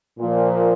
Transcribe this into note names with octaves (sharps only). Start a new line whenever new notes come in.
A#2 F3